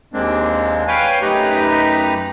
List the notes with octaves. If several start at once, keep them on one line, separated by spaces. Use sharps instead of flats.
D#2 G#3 A#3 C4 D4
B4 C#5 F5 G5 G#5
F#2 A3 D#4 G4 B4 A#5